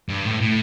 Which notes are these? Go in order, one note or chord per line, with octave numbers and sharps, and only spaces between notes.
G2
A2
A2